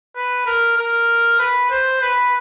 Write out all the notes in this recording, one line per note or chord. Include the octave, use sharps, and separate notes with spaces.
B4
A#4
A#4
B4
C5
B4